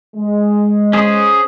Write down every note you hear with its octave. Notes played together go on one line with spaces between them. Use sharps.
G#3
C#4 G#4 C5